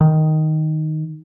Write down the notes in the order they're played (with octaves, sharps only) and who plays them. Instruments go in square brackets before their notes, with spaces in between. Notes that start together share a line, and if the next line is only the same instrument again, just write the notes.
[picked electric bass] D#3